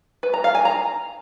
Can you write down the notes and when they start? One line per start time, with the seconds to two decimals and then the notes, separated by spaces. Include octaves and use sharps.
0.23 B4
0.34 A#5
0.44 F5
0.55 G#5
0.65 A#5